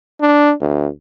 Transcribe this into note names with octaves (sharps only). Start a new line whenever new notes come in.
D4
D2